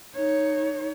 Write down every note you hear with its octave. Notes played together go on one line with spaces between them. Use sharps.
D#4 C#5